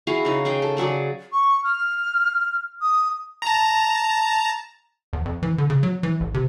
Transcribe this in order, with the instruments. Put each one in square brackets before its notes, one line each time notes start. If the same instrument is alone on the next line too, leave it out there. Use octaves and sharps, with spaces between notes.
[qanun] E4 F#4 G#4 F5
C#3 D#4
C#4 G#4 G5
A4
C#3 F#3 G#4 D5
[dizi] C#6
F6
D#6
[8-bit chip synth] A5 A#5
[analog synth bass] E2
F2
E3
D3
C#3
F#3
E3
A1
C3